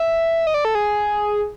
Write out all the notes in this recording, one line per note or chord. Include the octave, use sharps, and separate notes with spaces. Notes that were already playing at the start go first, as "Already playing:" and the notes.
Already playing: E5
D#5
D5
A4
G#4